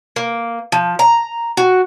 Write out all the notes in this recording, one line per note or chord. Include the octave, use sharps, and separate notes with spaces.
A#3
F3
A#5
F#4